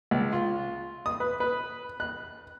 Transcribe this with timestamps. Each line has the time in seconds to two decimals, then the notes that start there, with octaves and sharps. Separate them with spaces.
0.11 C#2
0.33 F4
1.06 D#6
1.20 B4
1.40 B4
2.00 F#6